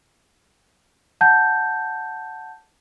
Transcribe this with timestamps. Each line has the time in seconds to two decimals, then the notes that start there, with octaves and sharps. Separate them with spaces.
1.21 F#5 A5 G6